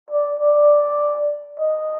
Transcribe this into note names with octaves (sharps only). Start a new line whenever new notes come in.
D5
D5
D#5